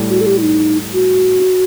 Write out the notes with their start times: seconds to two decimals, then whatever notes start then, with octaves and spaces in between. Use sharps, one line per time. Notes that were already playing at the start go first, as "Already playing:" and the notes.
Already playing: A2 G3
0.09 F#4
0.21 A4
0.26 G4
0.37 E4
0.42 D#4
0.93 F#4